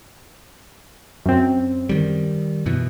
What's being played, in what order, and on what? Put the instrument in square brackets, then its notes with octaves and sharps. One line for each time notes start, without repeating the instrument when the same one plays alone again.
[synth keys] F#2 C4
[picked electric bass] D#3 G3
F#2 B2 E3